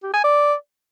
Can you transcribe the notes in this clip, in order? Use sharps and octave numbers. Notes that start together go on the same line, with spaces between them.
G4
G#5
D5